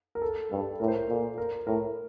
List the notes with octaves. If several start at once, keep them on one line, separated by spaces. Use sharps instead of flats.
A#4
A4
G2 A4
A2 A#4
C5
A#4
A#2 A4
A#4
A2 A#4